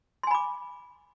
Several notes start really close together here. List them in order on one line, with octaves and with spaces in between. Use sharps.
C6 G#5 B5 D6